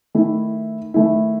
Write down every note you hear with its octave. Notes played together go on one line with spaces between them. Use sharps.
D#3 A3 E4
D#3 A3 E4